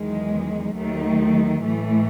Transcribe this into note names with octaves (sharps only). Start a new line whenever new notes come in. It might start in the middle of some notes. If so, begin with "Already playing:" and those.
Already playing: E2 D#3 F#3 G#3
D#2 D#3 F#3 A3
A2 E3 A3